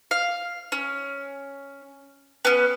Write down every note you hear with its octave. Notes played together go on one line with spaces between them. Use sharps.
F5
C#4
B3 C#4